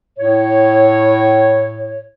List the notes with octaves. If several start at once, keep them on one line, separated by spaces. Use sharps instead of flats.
A2 C#5